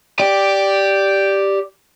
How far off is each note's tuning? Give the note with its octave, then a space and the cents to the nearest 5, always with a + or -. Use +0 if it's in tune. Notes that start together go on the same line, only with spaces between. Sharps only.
G4 +0 D5 +0